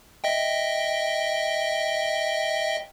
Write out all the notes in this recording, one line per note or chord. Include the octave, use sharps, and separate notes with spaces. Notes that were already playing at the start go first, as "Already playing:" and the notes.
D#5 E5 G5